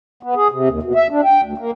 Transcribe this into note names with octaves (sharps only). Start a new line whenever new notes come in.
B3
G#4
C3
D#2
B2
E5
D4
G5
D2
A#3